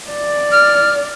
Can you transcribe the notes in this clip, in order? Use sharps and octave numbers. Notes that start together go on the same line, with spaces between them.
D5
F6